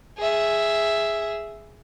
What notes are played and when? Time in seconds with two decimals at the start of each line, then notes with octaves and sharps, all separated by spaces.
0.18 G#4 E5